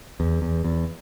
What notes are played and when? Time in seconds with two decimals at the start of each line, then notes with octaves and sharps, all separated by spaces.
0.20 E2
0.42 E2
0.64 E2